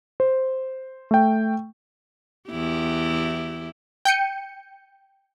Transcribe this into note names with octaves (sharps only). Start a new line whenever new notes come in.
C5
A3 G5
E2 E4 G4
G5 G6 C#7 D#7